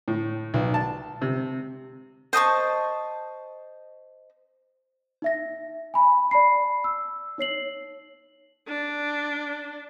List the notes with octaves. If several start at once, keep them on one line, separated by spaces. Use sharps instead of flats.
A2
B1
A5
C3
C5 D#5 A5 C#6
D#4 E5 A#6
G#5 B5
D5 A5 B5 C7
E6
D#4 C#5 C7 F#7
D4